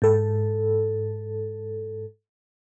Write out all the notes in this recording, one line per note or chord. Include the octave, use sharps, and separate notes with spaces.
G#2 A4